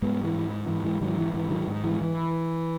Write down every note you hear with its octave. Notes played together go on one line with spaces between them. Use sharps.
G#2 G#3 B3
E3 G#3
G#2
G#2 E3
E3 G#3
G#2 D#3 F#3
E3
G#2 E3
D#3 F#3
G#2
E3 G#3
E3